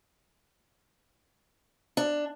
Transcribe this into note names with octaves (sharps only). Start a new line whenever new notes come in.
D4